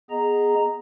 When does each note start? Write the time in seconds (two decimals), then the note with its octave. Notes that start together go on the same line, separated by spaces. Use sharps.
0.10 B3 G#4 D#5 A#5